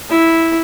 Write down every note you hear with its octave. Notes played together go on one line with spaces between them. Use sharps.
E4